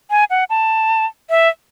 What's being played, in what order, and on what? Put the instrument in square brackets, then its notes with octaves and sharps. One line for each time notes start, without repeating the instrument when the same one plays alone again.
[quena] G#5
F#5
A5
E5